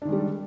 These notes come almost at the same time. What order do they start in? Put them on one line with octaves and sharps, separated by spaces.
D4 D#3 G#3 G3